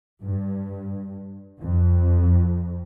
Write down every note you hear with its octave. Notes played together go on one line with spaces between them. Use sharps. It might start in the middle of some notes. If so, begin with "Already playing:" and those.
G2
F2